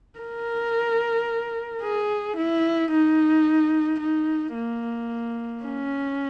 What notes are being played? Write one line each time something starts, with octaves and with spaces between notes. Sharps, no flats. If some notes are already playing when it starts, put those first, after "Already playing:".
A#4
G#4
E4
D#4
D#4
A#3
C#4